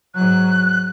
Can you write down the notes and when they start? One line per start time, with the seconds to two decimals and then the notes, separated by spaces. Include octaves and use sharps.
0.15 G#2 F#3 F#6